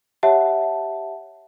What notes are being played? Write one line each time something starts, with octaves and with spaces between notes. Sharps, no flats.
G4 C#5 E5 F#5 A5